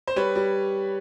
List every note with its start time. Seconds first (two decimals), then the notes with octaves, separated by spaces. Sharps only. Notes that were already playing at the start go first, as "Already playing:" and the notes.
0.07 C5
0.16 G3 B4 C#5
0.36 G3